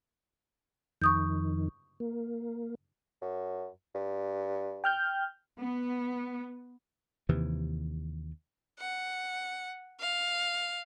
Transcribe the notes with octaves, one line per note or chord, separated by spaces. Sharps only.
F2 D#3 C#6 D#6 G6
A#3
F#2
G2
G5 F6 G6
B3
D#2 C3 E3
F#5
F5